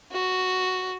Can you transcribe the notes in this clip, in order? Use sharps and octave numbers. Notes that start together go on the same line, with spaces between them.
F#4